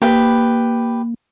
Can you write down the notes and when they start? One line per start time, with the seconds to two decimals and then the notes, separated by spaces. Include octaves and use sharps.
0.02 A#3 G4 B4 B5